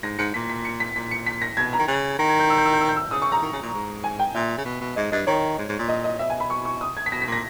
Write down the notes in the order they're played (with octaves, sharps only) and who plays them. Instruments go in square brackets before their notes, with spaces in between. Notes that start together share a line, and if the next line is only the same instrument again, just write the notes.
[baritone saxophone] G#2 [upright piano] A#6
[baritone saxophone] G#2 [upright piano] C#7
[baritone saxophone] A#2 [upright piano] B6
[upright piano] B6
C#7
B6
[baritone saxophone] A#2 [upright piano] B6
[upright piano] C#7
B6
A#6
[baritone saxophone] B2 [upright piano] G#6
[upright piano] A#5
[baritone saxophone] D#3
C#3
[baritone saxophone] D#3 [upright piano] A#6
[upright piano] G#6
G6
E6
G6
E6
G6
E6
G6
E6
[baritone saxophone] C#3 [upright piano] D#6
[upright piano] C#6
A#5
[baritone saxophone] D#3
C#3
A#2
G#2
[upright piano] G#5
G5
[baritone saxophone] A#2 [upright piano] E5
[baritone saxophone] C#3
B2
B2
[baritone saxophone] G#2 [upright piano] D#5
[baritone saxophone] G2 [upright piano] D#5
[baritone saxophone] D#3 [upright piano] C#5
[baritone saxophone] G#2
G#2
A#2
[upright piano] D#5
D#5
[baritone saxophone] B2 [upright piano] E5
[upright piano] G#5
B5
C#6
C#6
D#6
G#6
B6
[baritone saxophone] B2 [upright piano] A#6
[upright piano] B6
[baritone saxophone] A#2
[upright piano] A#6